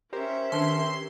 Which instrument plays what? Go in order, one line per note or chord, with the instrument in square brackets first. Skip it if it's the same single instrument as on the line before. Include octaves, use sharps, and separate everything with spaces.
[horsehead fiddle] C#4 E5 [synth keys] G4 A#4 C5
[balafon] D#3 D4 B4 [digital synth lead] C6